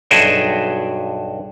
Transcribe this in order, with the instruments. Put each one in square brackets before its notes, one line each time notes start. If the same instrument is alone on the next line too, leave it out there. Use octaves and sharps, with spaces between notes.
[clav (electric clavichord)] B1 G2 F#4 G#4 E5 G5